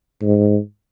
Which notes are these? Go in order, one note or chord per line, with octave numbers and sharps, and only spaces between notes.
G#2